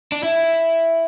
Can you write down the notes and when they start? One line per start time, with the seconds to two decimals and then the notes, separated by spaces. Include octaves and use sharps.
0.12 D4
0.23 E4